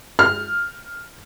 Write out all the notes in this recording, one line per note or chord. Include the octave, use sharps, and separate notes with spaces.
F6